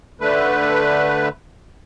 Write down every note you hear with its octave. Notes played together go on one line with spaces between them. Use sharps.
D3 A3 B4